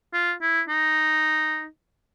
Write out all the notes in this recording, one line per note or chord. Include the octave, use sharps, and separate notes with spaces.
F4
E4
D#4